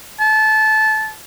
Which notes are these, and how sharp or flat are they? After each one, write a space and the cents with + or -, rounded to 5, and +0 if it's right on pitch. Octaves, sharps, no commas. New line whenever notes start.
A5 -20